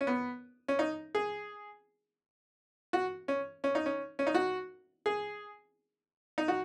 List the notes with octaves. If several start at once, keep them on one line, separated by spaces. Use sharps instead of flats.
C#4
B3
C#4
D#4
G#4
F#4
C#4
C#4
D#4
C#4
C#4
D#4
F#4
G#4
D#4
F#4